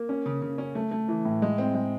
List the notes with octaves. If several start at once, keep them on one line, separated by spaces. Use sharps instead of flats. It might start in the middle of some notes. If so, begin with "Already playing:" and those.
Already playing: A#3
C#4
C#3
C#3
C#4
A3
A3
E3
A2
G#3
C4
G#3